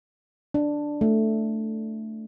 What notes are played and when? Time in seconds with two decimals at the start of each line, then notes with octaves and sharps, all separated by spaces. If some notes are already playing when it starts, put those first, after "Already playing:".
0.54 D4
1.01 A3